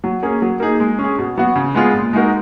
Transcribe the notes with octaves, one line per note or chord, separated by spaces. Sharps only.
F#3
A#3 C#4 G#4
F#3
A#3 D#4 G#4
G#3
C#4
G#4
B2
F#3 B3 F#4
C#3
G#3 B3 F4 G#4
A#2
G#3 D#4 F#4 A#4